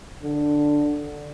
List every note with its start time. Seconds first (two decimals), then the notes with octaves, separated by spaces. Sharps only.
0.22 D3